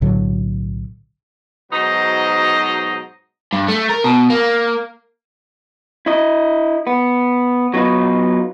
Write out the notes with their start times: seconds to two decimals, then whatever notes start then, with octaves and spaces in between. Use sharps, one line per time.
0.01 B1 A2 D3 F#3
1.72 G#2 B2 F#3 D#4 C5 D#5
3.53 G2
3.68 A3
3.89 A#4
4.04 B2
4.30 A#3
6.06 E4 D#5
6.87 B3
7.74 F#3 B3 D#4 F4 B4